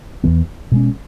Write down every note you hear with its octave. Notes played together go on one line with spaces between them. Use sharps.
E2 E3 B3
B2 G#3 C#4